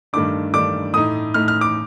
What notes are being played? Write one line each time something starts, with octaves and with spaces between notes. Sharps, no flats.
G2 D#3 A3 D4 D6
G2 D#3 A3 D4 D6
A2 A3 D#4 D#6
A2 A3 D#4 F6
F6
D6